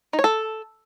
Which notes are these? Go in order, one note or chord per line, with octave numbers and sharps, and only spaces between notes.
D#4
C#5
A4